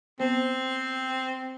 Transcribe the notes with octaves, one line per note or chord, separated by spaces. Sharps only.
B3 C4 C5